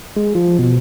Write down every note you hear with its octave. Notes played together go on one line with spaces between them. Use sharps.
G#3
F3
B2